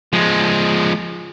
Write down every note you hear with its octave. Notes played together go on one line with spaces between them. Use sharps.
F3 G#3